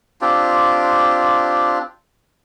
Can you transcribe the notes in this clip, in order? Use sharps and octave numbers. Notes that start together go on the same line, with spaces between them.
C4 D4 F4 G4